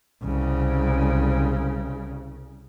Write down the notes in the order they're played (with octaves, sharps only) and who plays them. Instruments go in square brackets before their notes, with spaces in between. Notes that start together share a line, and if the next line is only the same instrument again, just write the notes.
[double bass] C2 C#3